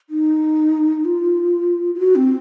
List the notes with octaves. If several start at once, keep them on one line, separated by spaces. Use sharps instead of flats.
D#4
F4
F4
F#4
C4